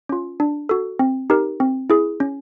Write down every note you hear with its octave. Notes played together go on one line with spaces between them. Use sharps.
C#4 F4
D4
F#4 A4
C4
D#4 G4 A#4
C4
E4 G#4
C#4